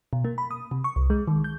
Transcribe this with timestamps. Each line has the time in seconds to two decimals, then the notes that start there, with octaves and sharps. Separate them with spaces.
0.13 B2
0.25 A#3
0.38 B5
0.51 D#6
0.71 C3
0.84 C#6
0.96 C2
1.10 G#3
1.28 D#3
1.44 G6